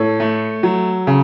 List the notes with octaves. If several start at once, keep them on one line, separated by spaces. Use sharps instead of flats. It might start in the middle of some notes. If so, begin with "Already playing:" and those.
Already playing: A2 A4 C#5
A3
F#3
C#3